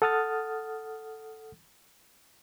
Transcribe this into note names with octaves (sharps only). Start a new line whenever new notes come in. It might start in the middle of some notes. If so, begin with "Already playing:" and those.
A4 F#5 D#6 F6 A6